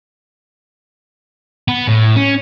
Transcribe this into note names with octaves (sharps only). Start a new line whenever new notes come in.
B3
A2
C#4